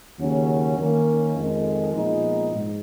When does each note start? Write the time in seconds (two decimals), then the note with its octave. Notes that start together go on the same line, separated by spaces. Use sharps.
0.19 D#2 C#3 F#3 C#4
0.77 D#3 A#3 C#4
1.35 F2 D#3 G#3
1.94 A#2 F3 G#3 B3 D#4
2.52 G#2